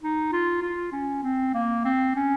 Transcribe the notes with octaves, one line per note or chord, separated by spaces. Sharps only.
D#4
F4
F4
C#4
C4
A#3
C4
C#4